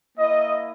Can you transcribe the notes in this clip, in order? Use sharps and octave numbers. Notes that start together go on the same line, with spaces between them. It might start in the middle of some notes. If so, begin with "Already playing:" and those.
A#3 E4 D#5